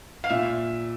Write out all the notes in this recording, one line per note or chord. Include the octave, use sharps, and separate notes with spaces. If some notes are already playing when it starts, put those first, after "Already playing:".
F5
A#2 E5